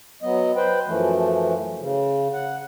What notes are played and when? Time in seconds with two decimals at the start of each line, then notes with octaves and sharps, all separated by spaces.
0.23 F#3 B3 D#5
0.56 B4 C5 G5
0.86 F#2 E3 F3 A3
1.79 C#3
2.33 F#5